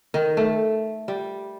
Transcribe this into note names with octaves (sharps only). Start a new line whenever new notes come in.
D#3
A3
G3